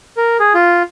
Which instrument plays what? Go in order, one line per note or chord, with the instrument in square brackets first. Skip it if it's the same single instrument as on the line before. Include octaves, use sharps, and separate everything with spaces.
[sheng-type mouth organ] A#4
G#4
F4